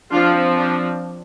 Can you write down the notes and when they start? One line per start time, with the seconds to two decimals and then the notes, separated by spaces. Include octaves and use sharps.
0.12 F3 C4 D4 F4
0.57 D4